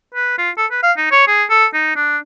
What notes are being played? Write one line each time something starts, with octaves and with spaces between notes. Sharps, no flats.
B4
F4
A4
B4
F5
D#4
C#5
G#4
A4
D#4
D4